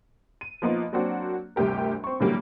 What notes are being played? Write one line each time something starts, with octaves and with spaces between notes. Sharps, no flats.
D#7
F3 A#3 B3 D#4 F4
F#3 A#3 C4 D4 F#4
G1 D2 C3 G4 A#4
C4 C#6
A2 D3 E3 F#3 G3 A#3